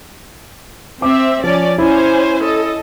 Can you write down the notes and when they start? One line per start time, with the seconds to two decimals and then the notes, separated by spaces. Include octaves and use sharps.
1.02 C4 E5 D6
1.44 F3 C#4 D5
1.78 C#4 E4 C5 G#5
2.42 A4 D#5